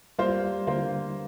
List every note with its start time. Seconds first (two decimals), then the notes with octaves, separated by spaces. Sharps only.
0.19 G3 A#3 F4 C5
0.67 D3 A#3 F4 C5